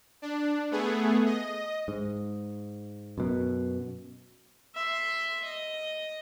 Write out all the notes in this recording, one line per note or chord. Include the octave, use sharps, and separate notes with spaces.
D4
A3 B3 G#4
D#5
G#2
F#2 B2
E5 C6
D#5